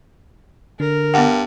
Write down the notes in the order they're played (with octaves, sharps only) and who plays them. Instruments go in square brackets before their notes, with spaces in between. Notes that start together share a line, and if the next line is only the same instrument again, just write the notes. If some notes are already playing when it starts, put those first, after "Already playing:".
[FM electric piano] D3 [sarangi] A#4
[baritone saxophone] G2 [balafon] B3 F#5